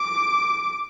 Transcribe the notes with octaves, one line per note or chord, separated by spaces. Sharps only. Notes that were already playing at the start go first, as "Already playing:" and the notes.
Already playing: D6